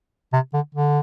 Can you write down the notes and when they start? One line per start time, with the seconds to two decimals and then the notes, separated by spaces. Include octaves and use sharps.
0.33 C3
0.54 D3
0.75 D3